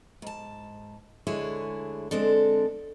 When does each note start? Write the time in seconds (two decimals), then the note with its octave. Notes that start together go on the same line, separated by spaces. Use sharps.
0.22 G#2 A5
1.27 D2 D3 G#3 E4 G#4 C#5
2.11 D3 G#3 C4 D4 A4